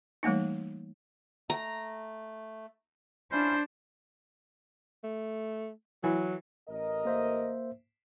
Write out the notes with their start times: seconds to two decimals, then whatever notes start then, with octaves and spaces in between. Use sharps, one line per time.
0.23 E3 G3 A3 A#3 D#4
1.50 A3 A#5
3.32 C#4 D4 E4 F4 C5
5.04 A3
6.04 E3 F#3
6.68 A1 A#4 D#5
7.05 A#3 C5 E5